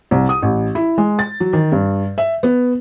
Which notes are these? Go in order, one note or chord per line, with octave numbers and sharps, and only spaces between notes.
C2
D#6
A1
E4
G#3
A6
F#3
D#3
G2
E5
B3